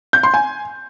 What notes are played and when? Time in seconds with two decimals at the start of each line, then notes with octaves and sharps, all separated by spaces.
0.13 G6
0.23 C6
0.34 G#5